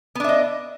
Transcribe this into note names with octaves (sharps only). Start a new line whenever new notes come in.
B3 D4 D#5 E5